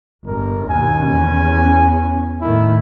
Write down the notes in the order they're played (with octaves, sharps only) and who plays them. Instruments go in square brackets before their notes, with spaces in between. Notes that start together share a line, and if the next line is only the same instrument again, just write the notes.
[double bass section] G1 [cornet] A#4
[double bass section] D#2 B2 [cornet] G#5
[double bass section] E2 C#4
[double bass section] A2 D#3 A3 [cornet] E4